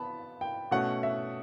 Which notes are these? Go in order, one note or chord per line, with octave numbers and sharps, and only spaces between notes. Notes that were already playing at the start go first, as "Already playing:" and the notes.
Already playing: B3 A5 B5
G5
B2 A3 C#4 F#5
E5